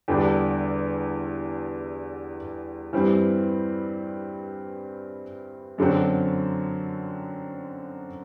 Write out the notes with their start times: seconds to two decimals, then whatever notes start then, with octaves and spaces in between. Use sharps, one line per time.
0.08 E2 D3 G3 D4
2.93 G2 E3 G3 C4
5.78 F#2 D3 F#3 C4